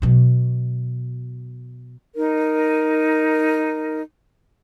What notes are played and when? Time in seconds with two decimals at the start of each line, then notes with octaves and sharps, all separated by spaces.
0.02 B2 F#3
2.15 D#4 A#4